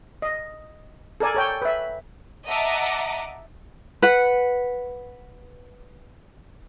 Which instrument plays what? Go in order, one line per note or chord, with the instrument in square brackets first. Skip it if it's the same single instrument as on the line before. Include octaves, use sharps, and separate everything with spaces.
[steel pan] D#5
A4 A#4 D5 G#5
A4 C#5 G5
B4 E5
[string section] D#5 E5 F#5 A5 A#5 D6
[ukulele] B4 F#5